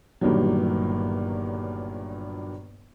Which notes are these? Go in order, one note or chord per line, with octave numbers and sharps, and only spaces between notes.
G1 G2 A#2 D#3 F#3